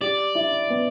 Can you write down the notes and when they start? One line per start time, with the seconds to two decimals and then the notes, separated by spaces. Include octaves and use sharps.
0.01 G4 D5
0.35 E4
0.70 B3